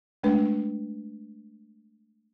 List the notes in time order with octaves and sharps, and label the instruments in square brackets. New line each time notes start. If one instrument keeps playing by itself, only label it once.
[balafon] G#3 A3 D4 B4